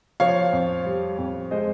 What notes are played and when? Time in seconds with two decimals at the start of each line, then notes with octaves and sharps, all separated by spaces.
0.20 F3 C#5 F5
0.53 F2
0.85 G3
1.18 F2
1.51 G#3 C5 D#5